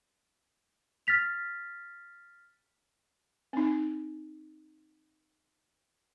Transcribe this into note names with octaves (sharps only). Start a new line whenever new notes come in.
F6 A6 B6 F7
C4 D#4